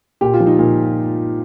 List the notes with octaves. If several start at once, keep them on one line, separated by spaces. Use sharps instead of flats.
A#2 G4
F4
F3
D#4
A#2